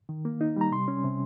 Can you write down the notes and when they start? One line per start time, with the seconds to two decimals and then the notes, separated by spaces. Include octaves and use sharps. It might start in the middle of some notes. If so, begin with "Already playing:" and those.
0.09 D#3
0.25 A#3
0.41 D#4
0.56 G3 A#5
0.71 C3 C6
0.88 C#4
1.04 C3